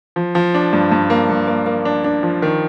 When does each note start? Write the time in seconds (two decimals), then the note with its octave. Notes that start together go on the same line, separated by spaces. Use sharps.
0.16 F3
0.35 F3
0.55 D4
0.73 G2
0.92 G2
1.10 A#3
1.30 G2
1.48 A#3
1.66 A#3
1.85 D4
2.04 D4
2.23 F3
2.42 D#3